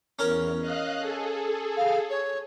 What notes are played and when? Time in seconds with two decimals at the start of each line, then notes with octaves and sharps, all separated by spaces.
0.19 E2 C#4 A#4
0.61 D#5 F5 F#6
1.00 G#4 A4
1.77 F5
2.10 C#5